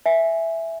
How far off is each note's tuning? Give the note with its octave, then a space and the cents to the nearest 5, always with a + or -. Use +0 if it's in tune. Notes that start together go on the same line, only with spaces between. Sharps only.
E5 +0 G#5 +0